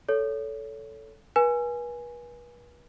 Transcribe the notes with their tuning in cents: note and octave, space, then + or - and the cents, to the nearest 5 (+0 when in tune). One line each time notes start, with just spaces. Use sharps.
A4 +0 C#5 +25
B4 -40 G#5 +0